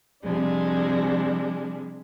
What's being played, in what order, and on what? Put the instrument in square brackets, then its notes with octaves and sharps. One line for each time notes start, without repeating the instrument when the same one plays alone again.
[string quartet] C3 F3 G3 G#3 D4